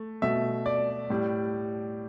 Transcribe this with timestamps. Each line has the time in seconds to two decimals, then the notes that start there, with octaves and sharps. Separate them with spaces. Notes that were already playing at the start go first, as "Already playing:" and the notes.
Already playing: A3
0.22 B2 A3 E5
0.66 D5
1.10 A2 G3